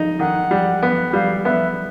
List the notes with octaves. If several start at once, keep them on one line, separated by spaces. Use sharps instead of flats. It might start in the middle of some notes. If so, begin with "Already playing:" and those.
Already playing: D#4
D#3 F#5
G3
B3
F#5
G3 F5
B3 E5